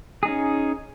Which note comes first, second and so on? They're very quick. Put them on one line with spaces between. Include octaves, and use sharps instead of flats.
G#4 D#4 C#4